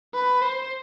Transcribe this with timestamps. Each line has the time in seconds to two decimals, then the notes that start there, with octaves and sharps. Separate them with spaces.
0.14 B4
0.42 C5